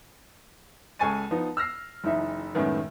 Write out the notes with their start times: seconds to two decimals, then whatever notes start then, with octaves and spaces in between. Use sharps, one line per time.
0.99 C#2 A4 G#5 C#6 A6 D#7
1.31 F3 B3 D#4
1.57 E6 F6 A#6 C7
2.04 F#1 E3 D#4 E5
2.55 C#2 F#2 A2 D#3 B3